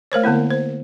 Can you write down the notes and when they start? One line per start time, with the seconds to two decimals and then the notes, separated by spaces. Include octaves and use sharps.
0.12 A3 A#4 C5 C#5
0.23 D3 A#3 B3 E4
0.50 C5